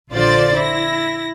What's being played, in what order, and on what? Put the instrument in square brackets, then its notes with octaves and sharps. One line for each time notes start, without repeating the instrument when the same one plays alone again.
[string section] A#1 D3 F4 C5 D5 A6
E4 A#6